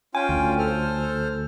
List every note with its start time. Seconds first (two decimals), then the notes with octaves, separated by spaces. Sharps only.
0.15 C#4 F4 G5 G#5
0.29 D2
0.58 A4 C5 F6